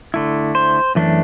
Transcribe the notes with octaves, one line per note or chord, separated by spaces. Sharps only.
D3 A3 E4
C5
F#2 E3 A3 D4